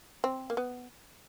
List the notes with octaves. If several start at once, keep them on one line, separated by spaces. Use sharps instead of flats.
C4
A#3
B3